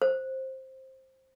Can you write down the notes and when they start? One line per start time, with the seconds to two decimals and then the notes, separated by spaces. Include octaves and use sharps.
0.02 C5